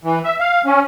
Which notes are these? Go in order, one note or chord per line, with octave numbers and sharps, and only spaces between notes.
E3
E5
F5
C#4